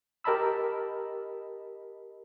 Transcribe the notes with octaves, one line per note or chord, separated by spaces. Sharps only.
G4 A#4 D#5 A5 B5 E6